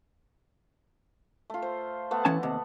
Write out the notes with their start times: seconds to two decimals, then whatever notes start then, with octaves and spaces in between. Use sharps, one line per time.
1.50 A3 F4
1.62 C5
2.11 A3 B3 F#5
2.25 E3 C#4 A5
2.43 D#2 C3